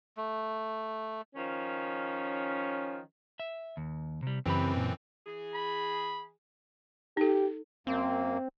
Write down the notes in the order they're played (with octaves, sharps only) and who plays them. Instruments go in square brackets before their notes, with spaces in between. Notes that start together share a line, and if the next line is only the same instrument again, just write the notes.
[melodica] A3
[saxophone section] D#3 F3 C#4
[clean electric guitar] E5
D#2
C3 G3
[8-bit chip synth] F#2 E3 C4 [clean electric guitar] C#3 G4 B5
[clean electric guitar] A#2
[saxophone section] E3 G#4
[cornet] B5
[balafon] D#4 A4 [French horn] G4
[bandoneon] F#2 A#3 [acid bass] C4